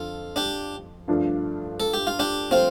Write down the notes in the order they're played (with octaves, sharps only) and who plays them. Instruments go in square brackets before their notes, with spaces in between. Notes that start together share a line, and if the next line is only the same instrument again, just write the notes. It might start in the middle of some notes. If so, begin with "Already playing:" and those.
Already playing: [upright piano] F2 D3 F3 [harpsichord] F4 A4
[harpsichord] D4 G4
[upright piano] G2 F3 A3 D4 F4
[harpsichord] A4
G4
F4
D4 G4
[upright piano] F3 A3 [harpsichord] C4 F4